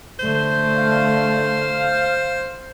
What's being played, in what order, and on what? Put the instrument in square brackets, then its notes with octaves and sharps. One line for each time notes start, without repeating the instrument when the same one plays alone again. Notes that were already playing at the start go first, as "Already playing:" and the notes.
[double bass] D3 A3 [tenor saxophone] C5
[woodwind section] F5